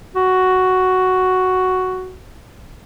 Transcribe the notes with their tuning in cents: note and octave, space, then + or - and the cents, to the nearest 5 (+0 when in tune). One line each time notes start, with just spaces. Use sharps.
F#4 +5